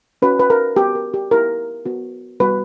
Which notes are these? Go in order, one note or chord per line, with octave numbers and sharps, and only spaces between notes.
C#4 F#4 B4
B4
A#4
B3 F#4 G4
A#4
G4
B3 E4 G4 A#4
B3 F#4
G3 B3 F#4 B4